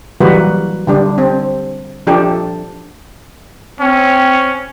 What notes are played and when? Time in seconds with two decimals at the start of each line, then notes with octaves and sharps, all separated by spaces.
0.20 E3 F#3 G3 A#3 F#4 B4
0.87 D3 G3 D4
1.18 C4
2.07 F3 D4 G4 A4
3.80 C4 C#4